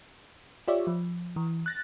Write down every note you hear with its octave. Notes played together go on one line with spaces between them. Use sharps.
F4 G4 C#5 D5 E5
F3
E3
F#6 A6 A#6